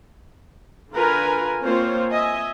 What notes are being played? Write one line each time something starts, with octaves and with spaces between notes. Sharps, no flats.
D3 F4 A#4 B4 G#5
A#3 C4 F4 C5 C#5
D#5 E5 G#5